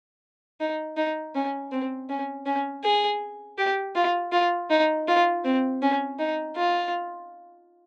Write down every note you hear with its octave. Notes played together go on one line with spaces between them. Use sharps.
D#4
D#4
C#4
C4
C#4
C#4
G#4
G4
F4
F4
D#4
F4
C4
C#4
D#4
F4